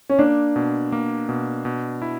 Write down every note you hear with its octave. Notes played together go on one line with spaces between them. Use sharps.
C#4
A#3 D4
B2
A#3
B2
B2
E4